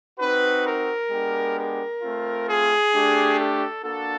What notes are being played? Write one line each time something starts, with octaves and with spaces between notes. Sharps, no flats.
C4 D#4 F#4 B4
A#4
G#3 B3 D4 G4
A#4
A3 C4 F4
G#4
A3 D4 G4
A4
A#3 D4 F#4 A4